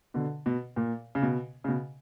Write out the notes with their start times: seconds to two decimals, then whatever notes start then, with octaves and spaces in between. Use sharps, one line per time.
0.14 B2 D3
0.46 B2
0.76 A#2
1.15 C#3
1.22 B2
1.64 C#3
1.68 B2